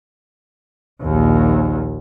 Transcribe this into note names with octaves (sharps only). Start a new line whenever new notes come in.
A#1 D#2